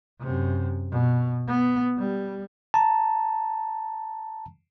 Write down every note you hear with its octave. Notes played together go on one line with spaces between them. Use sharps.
F#2 C3
B2
B3
G3
A5 A#5